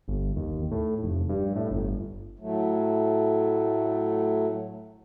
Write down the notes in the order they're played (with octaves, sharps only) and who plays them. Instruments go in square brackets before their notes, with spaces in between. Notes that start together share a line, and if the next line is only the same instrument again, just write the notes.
[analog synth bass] G1
D#2
A2
F1
G2
A2
G1
[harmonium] A2 F#3 A3